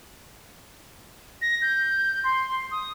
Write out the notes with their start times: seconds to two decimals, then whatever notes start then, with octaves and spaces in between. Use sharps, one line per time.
1.42 A#6
1.62 G6
2.24 C6
2.71 D#6